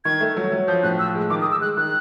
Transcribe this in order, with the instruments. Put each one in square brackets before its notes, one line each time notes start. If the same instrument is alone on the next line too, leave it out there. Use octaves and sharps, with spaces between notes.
[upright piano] D#3 [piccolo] G#6
[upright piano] A3
F#3
F#3
[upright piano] F3 [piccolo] G6
[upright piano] A2 [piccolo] F#6
[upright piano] F3 [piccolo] E6
[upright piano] G#3
[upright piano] D#3 [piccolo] D6
[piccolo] D#6
[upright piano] G#3
[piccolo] E6
[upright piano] G#3 [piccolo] F#6
[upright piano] D#3 [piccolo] F#6